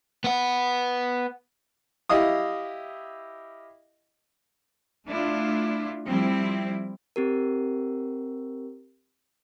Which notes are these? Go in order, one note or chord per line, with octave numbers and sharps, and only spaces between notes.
B3 F#5
E4 G4 D#5 F5 D#6
A3 D4 E4 F4
F3 G3 C4 E4
C4 G4 A#4